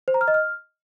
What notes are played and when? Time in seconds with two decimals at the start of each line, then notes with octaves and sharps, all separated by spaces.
0.08 C5
0.14 A#5
0.21 F6
0.28 D#5
0.34 F6